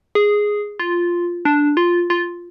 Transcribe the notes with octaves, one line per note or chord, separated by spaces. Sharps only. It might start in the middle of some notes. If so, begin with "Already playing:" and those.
G#4
F4
D4
F4
F4